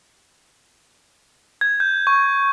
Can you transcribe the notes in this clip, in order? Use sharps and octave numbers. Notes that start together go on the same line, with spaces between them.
G#6
G6
C#6